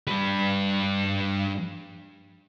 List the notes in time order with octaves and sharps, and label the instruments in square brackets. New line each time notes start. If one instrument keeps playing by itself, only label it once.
[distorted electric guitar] G2 B4